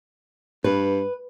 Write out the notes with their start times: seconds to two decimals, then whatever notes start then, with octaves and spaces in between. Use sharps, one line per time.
0.64 G2 B4